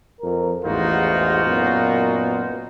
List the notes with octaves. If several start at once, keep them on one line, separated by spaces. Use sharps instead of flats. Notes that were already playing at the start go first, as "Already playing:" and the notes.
F2 A#4
A1 E2 G#2 D#4 F4 F#4
F#2 A#2 B3